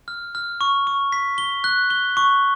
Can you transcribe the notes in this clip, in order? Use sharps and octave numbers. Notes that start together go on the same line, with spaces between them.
F6
F6
C#6
C#6
B6
G7
F#6
G7
C#6